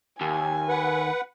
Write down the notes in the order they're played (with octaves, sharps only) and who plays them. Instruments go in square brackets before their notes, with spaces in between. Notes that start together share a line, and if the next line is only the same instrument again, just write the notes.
[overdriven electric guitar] D#2 [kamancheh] G#5
[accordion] B4 F#5